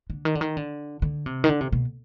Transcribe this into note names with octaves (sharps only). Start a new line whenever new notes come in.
D3
D#3
D3
D#3
D3
D3
C3
D#3
D3
C3
B2